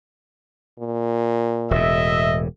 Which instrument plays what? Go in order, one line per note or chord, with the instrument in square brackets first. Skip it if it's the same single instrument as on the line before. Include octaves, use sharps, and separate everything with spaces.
[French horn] A#2
[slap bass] E1 A2 [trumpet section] D#5 E5